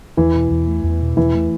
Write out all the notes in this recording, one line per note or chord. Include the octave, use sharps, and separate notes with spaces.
E2 E3
B2
E2
A3
E2
B2
E2 E3
A3